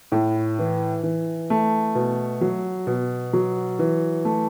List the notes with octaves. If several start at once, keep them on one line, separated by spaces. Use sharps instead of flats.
A2
E3
E3
A3
B2
F#3
B2
F#3
E3
A3